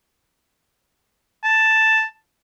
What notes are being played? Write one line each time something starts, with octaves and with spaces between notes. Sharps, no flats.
A5